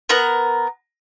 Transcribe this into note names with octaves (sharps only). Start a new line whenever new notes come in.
B3 A#4 F#5 A#5